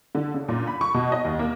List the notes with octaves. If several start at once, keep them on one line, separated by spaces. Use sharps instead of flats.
D3
C#3
A#2
B5
C#6
B2
D#5
D#2
A#3